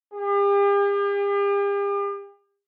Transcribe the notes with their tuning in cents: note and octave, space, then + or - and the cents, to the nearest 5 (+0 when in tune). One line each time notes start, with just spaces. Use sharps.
G4 +45